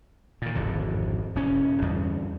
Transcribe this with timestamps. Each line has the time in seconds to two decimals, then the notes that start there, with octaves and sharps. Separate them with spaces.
0.42 A#2 D#3
0.55 D1 G#1 F2 D3
1.35 E1 C#4
1.82 E2 G2 D3